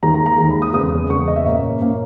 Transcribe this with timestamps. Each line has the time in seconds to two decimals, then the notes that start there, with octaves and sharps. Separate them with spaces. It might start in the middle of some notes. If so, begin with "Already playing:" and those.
0.02 D#2 D#3 G#3 A#5
0.14 A#5
0.26 A#5
0.38 D#2 D#3 G#3
0.50 B5
0.62 D#6
0.73 E2 C#3 G#3 D#6
1.10 E2 C#3 G#3 C#6
1.28 D#5
1.36 E5
1.45 A#2 A#3 C#4
1.81 A#2 A#3 C#4